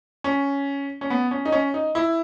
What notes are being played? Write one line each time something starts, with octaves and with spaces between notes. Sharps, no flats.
C#4
C#4
B3
C#4
D#4
C#4
D#4
E4